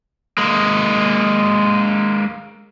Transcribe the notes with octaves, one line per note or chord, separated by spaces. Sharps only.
G#3 A#3